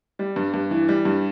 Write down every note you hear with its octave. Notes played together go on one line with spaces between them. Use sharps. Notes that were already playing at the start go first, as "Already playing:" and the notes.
G3
G2
G2
E3
G3
G2